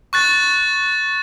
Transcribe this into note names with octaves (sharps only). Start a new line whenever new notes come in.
C#6 F#6 A6